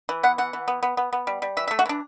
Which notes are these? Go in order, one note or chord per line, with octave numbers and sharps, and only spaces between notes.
E3
B3 F#5
E3 F#5
E3
B3
B3
B3
B3
G3
G3
E3 E5
A3 E5
F#4
E3 D4